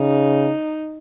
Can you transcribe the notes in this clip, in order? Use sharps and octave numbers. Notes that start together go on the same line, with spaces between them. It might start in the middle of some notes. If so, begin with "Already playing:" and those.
Already playing: C#3 D#4